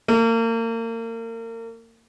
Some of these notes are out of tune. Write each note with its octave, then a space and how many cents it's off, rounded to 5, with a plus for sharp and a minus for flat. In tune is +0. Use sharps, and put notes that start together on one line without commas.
A#3 -35